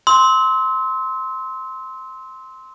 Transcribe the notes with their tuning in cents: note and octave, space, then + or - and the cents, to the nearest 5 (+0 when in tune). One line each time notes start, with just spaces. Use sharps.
C6 +0 E6 -35